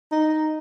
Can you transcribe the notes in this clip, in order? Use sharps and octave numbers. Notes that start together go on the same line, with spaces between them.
D#4